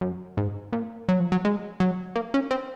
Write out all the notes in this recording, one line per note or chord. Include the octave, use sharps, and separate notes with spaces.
F#2
G#2
A#2
F#3
F3
F#3
G#3
F#3
A#3
C#4
C4